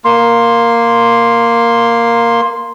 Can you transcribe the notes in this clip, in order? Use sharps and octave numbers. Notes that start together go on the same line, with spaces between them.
A#3 C6